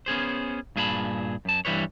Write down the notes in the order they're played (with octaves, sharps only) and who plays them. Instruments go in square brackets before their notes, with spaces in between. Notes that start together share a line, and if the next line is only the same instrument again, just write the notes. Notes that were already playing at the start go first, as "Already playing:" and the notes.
[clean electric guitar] B3 C#4 G#4 C5
G2 A#2 G#4 B4 A5 B5
F#2 A5
G2 E3 G3 B4 C#5